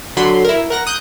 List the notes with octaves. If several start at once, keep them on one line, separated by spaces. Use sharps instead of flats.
D3 F#3 B5 C6
E4 A#4
A#4 F#5 A#6
D#6 F#6 G6